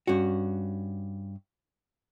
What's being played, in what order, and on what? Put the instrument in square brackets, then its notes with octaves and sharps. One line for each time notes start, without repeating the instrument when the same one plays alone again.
[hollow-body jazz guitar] G2 C#4 F#4